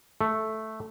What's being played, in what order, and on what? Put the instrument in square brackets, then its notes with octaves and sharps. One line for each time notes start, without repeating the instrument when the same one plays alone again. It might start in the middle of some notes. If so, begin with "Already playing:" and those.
[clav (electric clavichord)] A3